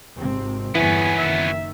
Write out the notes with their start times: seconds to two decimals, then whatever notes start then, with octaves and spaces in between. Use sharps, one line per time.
0.16 G#1 C3 C4
0.75 G1 E2 E3 B3 C#4 G#5
1.18 F#1 D#3 E5